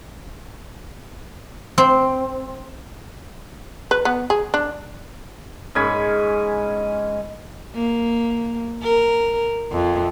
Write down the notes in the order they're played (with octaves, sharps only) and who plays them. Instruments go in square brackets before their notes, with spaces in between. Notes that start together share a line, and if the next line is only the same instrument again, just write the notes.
[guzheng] C4
[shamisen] B4
B3
G#4
D4
[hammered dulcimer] G#2 C#4 G#5 B5
[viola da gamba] A#3
A#4
F2